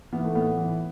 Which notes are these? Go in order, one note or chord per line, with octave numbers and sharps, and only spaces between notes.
E3 B3
A3
A2 B3
E3